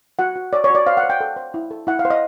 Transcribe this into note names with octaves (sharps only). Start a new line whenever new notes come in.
F#4 F#5
F#4
C#5 D5
C#5
F#4 D5
C5 F5
F#5
C5
G5
A4
C5
E4
A4
E4 F#5
F5
C5
D#5